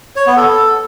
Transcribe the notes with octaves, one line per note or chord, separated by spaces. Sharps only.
C#5
B3
A4